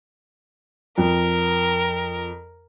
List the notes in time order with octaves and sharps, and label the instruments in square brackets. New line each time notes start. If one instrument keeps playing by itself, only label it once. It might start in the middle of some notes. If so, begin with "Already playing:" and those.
[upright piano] F2 [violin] A#4